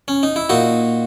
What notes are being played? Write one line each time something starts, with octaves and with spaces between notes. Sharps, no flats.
C#4
D#4
E4
A#2 D#4 F#4